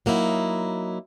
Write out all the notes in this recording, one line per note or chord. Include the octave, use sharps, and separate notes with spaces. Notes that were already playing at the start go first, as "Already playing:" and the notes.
F#3 A#3 D#4 E4